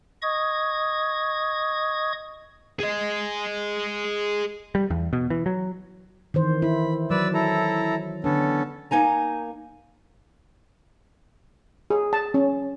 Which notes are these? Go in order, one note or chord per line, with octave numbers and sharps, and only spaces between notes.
D#5 C#6 D#6 G#6
G#4 D#5
G3
E2
B2
E3
F#3
D#3 E3 C5
E4 B5
F#3 B4 D5 E6
E4 A4 A#5
D3 B3 C#4 D4 A4
A#3 D#4 G#5 A#5
G#4
A5
C#4